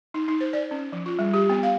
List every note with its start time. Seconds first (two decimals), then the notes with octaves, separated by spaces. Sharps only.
0.14 D#4
0.28 D#4
0.41 C5
0.53 D5
0.71 C#4
0.93 F3
1.06 F4
1.19 G3
1.34 G4
1.50 B3
1.63 F5